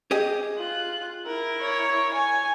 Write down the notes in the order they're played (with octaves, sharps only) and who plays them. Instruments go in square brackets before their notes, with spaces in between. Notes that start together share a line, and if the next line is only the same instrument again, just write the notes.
[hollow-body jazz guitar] G4 G#4 D#5
[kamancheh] F4 F#6
E4 A#4
[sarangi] C#5
G#5